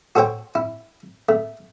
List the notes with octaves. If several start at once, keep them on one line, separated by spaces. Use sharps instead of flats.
F#4 A4 C5 C#5 G5
E4
A3